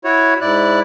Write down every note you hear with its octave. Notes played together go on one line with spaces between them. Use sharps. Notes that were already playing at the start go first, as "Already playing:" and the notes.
E4 F#4 C#5
G#2 E4 D5 F#6